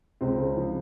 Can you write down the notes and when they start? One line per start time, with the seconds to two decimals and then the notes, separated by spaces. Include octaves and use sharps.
0.21 C#2 C4
0.38 C#3
0.57 F3